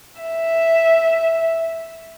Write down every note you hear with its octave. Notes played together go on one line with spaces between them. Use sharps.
E5